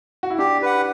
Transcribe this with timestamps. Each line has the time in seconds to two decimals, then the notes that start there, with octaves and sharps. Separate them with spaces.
0.23 F#4
0.30 E4
0.39 D4 G4
0.62 B4 F#5